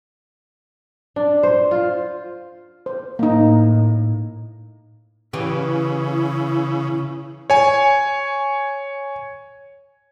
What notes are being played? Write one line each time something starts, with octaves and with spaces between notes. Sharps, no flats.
D4
C5
F4
C5
A2 A#3 D#4
C#3 E3 E4 G4
C#5 G#5